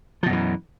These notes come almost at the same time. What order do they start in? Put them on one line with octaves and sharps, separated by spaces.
F3 B2 F#2 E3